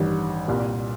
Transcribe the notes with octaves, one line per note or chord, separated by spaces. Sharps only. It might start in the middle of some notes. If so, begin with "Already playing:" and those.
Already playing: A1 G2 D#3 G3
C2 A#2 G3